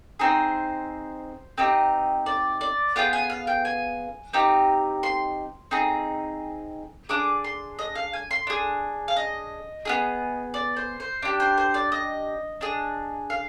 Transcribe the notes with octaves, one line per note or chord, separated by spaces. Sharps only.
C4 D#4 G#4 C5
C4 D#4 G4
D5
D5
B3 F4 G#4 G5
G#5
F5
G5
G#5
C4 D#4 G4
C6
C4 D#4 G#4
D4 G#4 D6
C6
D#5
F5
G#5
C6
D4 G#4
F5
D#5
B3 F4 G#4
D5
C5
C5
D4 G4
C5
C5
D5
D#5
D4 G#4
F5